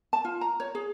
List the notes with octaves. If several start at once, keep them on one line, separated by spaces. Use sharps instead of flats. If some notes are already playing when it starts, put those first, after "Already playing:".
A5
F4
A#5
C#5
G#4